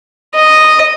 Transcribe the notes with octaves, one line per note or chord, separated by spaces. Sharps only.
D#5